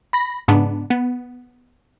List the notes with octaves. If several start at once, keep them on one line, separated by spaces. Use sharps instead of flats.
B5 A#6
G#2 C#3 B3 D4
B3